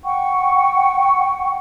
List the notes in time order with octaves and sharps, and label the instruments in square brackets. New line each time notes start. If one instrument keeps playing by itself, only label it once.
[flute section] F#5 G5 C#6